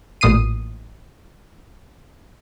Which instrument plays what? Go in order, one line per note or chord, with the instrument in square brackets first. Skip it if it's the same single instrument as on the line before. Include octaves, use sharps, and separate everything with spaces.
[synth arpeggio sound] A1 A#2 D#6 C7 D#7